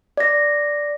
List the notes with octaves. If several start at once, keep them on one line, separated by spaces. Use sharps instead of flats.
D5 A#6